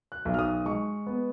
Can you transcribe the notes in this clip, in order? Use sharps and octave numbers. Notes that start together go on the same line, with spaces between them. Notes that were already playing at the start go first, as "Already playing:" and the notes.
F#6
B1
F6
D#6
G#3 C#6
B3